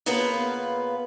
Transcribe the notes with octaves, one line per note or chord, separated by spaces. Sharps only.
C#3 A#3 B3 F4 B4